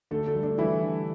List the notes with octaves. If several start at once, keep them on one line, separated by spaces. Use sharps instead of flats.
D3 A3 A4
A3 A4
G3
D4
E3 G3 E4
D3